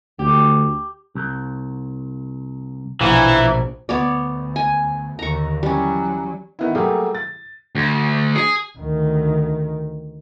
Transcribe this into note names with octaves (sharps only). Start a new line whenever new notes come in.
D2 G4
C2
A#1 B2 E3 C#6
D2 B3 C#5 D5
G#5
D#2 D3 A#5 C#6
E3 F#3 G3 C#4
D#3 B3 E4
F#3 G3 A3 A#3 G4 G#4
A6
D2
G#4
D2 D#3